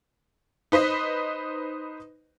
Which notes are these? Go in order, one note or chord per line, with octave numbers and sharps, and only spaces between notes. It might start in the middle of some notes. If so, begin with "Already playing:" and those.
D#4 B4 C5 D#5